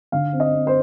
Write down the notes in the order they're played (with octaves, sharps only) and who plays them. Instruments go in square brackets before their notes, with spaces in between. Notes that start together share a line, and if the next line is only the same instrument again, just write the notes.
[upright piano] D3 F5
C4
D#5
C4
C5